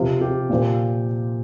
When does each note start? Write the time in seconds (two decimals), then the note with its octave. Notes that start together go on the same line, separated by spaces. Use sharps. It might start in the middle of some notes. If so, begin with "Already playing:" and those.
Already playing: C3 F3 F4
0.21 G4
0.50 A#2 F3